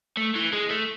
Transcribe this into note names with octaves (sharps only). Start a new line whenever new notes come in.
A3
E3
G#3
A3